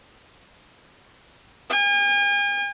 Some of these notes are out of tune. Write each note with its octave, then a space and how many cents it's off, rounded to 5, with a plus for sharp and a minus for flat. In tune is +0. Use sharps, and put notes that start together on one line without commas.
G#5 -45